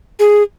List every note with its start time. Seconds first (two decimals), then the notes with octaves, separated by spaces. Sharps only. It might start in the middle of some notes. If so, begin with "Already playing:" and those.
0.19 G#4